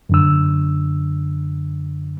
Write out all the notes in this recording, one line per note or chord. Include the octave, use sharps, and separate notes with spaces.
F#2 D3 E6